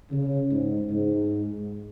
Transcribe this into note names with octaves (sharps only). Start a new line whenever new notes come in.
C#3
G#2
G#2